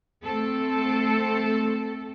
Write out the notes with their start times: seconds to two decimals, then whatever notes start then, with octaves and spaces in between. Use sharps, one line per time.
0.23 A3 C4 A4